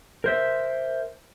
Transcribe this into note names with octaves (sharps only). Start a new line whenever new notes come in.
A#4 C5 E5